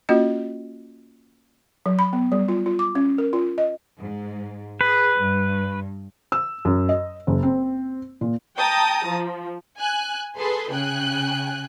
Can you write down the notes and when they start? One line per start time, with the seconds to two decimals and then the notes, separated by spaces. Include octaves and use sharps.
0.09 A#3 C#4 F4 F#4 D#5
1.86 F#3
1.99 B5
2.13 B3
2.32 G3
2.49 F4
2.66 F4
2.79 D6
2.95 C#4
3.18 A#4
3.33 F4
3.58 D#5
4.00 G#2
4.81 G#4 B4
5.18 G2
6.32 E6
6.65 F#2
6.89 D#5
7.27 F#1
7.43 C4
8.21 A#2
8.58 G5 A5 A#5 D#6
9.09 F3
9.77 G#5 F#6
10.38 G#4 A4 B4 C6
10.72 C#3 G5 G#5 F#6